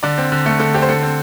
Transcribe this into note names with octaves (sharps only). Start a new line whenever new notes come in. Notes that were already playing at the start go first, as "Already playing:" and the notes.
D3 D5
C4
D3
A3 A4
D3 A4
C4 G4
C5
D3 A4
C4